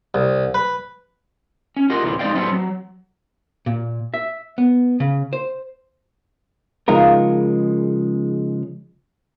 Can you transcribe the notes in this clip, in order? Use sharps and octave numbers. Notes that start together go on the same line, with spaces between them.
C2
B4
C#4
F4 G4 A#4 D#5 F#5
D2 A2 C3 E3
G#3 C4 D#4 D5 F5 G5
F#3 G3 A3 B3 C4
F#3
A#2
E5
B3
C#3
C5
C#3 F3 G#3 D#4 F4 A#4